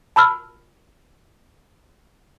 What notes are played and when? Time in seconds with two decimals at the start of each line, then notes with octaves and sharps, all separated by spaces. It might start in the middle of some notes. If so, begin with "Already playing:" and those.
0.16 A5 B5 E6 F6